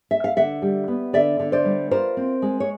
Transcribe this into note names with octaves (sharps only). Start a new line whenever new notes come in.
E5
F5
D3 E5 F#5
G3
B3
D3 D5 E5
D3
C5 D5
G3
F4 A#4 C5
C4
G#3
C#5